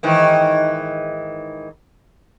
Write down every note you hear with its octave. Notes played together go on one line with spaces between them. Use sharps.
G#2 D#3 E3